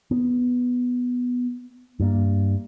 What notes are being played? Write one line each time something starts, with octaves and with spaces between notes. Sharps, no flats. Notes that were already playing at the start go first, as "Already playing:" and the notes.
B3
G2 A#3